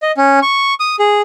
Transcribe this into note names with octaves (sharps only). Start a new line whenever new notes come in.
D#5
C#4
C#6
D#6
G#4